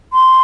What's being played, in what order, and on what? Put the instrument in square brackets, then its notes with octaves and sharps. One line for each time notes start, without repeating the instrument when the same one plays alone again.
[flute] C6